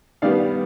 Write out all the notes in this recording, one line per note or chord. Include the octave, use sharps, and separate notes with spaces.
D#3 G3 B3 D5 F5